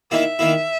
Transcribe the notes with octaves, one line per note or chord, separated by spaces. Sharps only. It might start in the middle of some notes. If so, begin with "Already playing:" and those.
D#3 A#3 E4 E5
D#3 A#3 E4